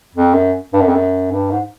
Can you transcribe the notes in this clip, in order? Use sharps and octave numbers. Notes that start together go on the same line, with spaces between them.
F2
F#2
G2
F#2
F2
F#2
G2
G#2